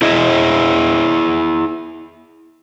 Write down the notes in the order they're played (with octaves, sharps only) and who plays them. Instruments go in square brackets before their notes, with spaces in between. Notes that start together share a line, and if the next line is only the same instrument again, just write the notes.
[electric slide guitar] E4 G#4 D#5 E5